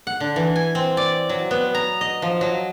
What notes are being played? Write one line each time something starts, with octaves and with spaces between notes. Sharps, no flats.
F#5
D3
E3
G#5
C4
D5
F#3
B3
A#5
D#5
F3
F#3